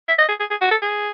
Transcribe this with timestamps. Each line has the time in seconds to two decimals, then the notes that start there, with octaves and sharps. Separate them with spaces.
0.09 E5
0.19 D#5
0.29 G#4
0.40 G#4
0.50 G#4
0.61 F#4
0.71 A4
0.82 G#4